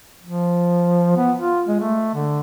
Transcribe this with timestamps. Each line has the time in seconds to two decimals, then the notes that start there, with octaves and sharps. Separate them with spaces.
0.24 F3
1.17 B3
1.39 F4
1.68 G#3
1.80 A3
2.14 D3